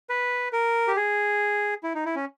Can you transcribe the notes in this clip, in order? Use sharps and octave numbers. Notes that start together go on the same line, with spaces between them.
B4
A#4
G4
G#4
E4
D#4
E4
C#4